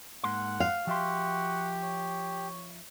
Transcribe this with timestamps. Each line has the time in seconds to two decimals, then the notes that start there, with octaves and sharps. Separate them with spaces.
0.24 G#2 A#3 F#5 C6
0.60 F5
0.87 F3 F#4 G4 E5 C6
1.83 C#5